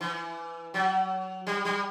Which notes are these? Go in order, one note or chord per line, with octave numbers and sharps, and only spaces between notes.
E3
F#3
G3
G3